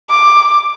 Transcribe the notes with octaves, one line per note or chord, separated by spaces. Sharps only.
D6